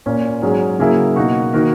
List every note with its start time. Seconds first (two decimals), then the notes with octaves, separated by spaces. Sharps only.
0.06 A#2 A#3 C#4
0.42 G#2 F#3 C#4 G#4
0.79 C#3 F#3 A#3 E4 G#4
1.16 B2 A#3 D#4 F#4
1.53 D#3 A#3 D#4 F#4 A#4